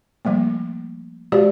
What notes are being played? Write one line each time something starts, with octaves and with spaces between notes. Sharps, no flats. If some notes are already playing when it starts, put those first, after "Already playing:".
F3 G3 A3 A#3
G#3 F#4 G4 C5 D5